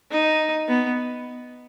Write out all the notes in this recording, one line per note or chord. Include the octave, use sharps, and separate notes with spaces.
D#4
B3